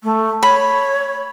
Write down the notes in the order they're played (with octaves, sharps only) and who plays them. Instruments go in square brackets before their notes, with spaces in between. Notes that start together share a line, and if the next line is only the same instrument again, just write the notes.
[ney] A3
[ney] C#5 [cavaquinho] B5